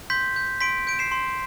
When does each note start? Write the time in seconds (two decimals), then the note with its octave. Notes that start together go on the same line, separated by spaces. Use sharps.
0.10 C6 G6 B6
0.36 G6
0.61 C6 B6 D7
0.87 G6 D7
0.99 C7 E7
1.12 C6